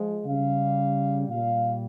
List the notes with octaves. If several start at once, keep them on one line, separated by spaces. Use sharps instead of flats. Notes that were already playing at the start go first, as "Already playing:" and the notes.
Already playing: F3 G#3
C#3 G3 F5
A#2 G3 F5